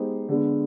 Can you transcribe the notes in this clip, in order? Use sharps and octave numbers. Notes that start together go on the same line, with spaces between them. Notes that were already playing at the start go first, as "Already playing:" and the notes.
Already playing: G#3 B3 D#4 G4 C5
D3 G#3 B3